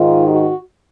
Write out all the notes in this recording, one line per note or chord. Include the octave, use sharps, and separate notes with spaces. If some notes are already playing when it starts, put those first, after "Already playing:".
Already playing: G#2 D#3 F4
F#4